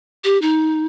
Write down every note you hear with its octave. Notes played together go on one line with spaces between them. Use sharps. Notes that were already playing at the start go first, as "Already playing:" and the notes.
G4
D#4